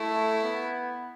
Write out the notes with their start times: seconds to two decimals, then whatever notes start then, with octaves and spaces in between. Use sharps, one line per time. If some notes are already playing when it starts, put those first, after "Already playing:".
Already playing: A3 E4
0.44 B3